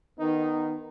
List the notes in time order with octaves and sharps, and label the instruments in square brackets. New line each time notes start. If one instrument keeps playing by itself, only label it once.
[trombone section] D#3 B3 D#4